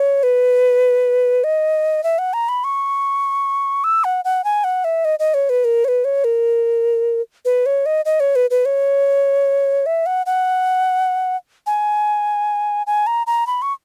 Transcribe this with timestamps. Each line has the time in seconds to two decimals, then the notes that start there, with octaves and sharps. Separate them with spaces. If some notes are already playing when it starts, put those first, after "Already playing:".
Already playing: C#5
0.23 B4
1.44 D#5
2.04 E5
2.18 F#5
2.33 A#5
2.49 B5
2.64 C#6
3.84 E6
4.04 F#5
4.25 F#5
4.44 G#5
4.64 F#5
4.84 E5
5.05 D#5
5.19 D#5
5.34 C#5
5.50 B4
5.65 A#4
5.85 C#5
5.88 B4
6.05 C#5
6.24 A#4
7.45 B4
7.66 C#5
7.86 D#5
8.05 D#5
8.20 C#5
8.36 B4
8.50 B4
8.65 C#5
9.86 E5
10.06 F#5
10.26 F#5
11.67 G#5
12.87 G#5
13.07 A#5
13.27 A#5
13.47 B5
13.62 C#6